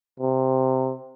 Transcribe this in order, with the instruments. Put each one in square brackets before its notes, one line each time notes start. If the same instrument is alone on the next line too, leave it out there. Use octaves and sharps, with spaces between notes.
[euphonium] C3